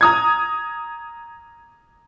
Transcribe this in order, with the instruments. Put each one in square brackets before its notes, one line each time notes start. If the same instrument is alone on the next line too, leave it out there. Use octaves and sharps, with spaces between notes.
[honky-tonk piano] A#5 D#6 G#6